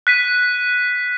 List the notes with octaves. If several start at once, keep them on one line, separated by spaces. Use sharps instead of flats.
F#6 B6 D#7